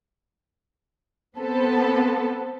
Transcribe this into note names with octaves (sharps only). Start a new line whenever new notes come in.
B3 C4 A4